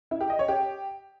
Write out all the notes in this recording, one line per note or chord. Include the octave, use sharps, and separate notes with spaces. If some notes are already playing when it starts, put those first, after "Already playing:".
E4
G4
D#5
C#5
G4